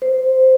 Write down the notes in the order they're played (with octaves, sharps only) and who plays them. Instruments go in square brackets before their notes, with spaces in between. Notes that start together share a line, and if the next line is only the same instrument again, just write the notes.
[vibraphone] C5